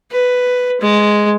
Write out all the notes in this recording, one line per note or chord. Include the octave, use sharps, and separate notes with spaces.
B4
G#3